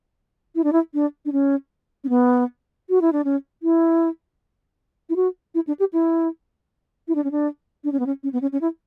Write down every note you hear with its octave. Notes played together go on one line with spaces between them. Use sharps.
E4
D4
E4
D4
D4
C#4
C#4
B3
F#4
E4
D4
C#4
E4
E4
F#4
E4
D4
G4
E4
E4
D4
C#4
D4
D4
C#4
B3
C#4
C#4
B3
C#4
C#4
E4